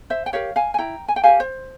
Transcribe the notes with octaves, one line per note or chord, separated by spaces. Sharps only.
C5 E5
G5
G4 A#4 C#5 F5
F5 G#5
G#5
E4 G5 A#5
G#5
G5
G4 A#4 F5 G#5
C5